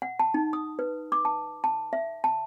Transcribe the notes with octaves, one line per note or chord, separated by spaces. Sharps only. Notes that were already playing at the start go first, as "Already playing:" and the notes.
F#5
A5
D#4
D#6
B4
D6
A5
A5
E5
A5